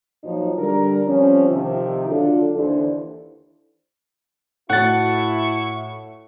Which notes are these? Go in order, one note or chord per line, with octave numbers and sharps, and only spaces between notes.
A#2 F3 F#3 D#4
D3 G3 A#4
F3 G3 C4 C#4
C3 D#3 F3
D3 F#3 D4 F4 A4
D#2 D3 E3 D4 A4 C5
A2 E4 F#4 F#5 A5 C#6